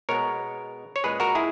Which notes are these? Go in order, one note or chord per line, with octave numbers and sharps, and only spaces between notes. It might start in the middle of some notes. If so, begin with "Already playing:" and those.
B2 G#3 B3 A#4 C#5
C#5
A#2 G#3 C#4 G#4 B4
F#4 A#4
E4 G#4